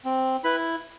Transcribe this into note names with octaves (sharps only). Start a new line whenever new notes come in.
C4
E4 B4 B5